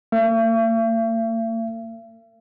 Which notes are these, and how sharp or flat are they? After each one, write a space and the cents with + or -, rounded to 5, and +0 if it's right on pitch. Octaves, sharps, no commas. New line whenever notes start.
A#3 -45 E5 +45